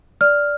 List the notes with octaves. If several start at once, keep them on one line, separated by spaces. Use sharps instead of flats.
D5 F6